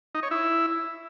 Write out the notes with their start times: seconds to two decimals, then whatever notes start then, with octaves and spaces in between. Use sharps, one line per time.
0.15 D#4
0.23 C#5
0.31 E4